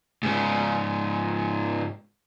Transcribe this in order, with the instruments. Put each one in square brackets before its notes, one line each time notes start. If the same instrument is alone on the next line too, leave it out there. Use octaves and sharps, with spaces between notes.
[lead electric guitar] G#2 C#3